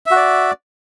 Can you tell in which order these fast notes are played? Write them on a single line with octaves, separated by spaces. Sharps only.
E5 F#4 D5